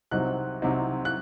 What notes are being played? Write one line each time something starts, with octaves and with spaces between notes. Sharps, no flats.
C2 C3 F#3 C4 D#4 F#6
C2 C3 F#3 C4 D#4
F#6